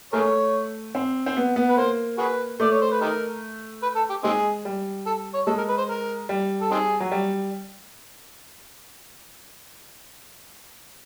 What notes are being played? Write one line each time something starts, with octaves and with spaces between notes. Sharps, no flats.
A3 G#4 A#4 C#5
C4
C4
B3
B3
B4
A#3 C5
F#4 G#4 B4
A3 D5
C#5
C5
B4
D#4 G4 A#4
B4
A4
G4
G#3 C4 D#4 G#4
G3
A4
C#5
G#3 A4
A#4
B4
C5
A#4
G3
A4
C4 D#4 G#4
F#3
G3